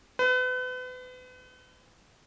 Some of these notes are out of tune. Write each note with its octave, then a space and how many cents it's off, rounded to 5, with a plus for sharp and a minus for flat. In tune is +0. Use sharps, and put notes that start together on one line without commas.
B4 +35